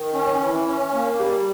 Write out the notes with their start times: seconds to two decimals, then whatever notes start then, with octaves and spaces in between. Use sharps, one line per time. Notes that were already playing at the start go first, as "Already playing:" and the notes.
Already playing: D#3
0.13 C#4
0.40 E3
0.66 C#4
0.94 A#3
1.19 G3 G4